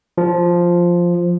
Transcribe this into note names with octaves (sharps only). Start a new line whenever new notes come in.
F3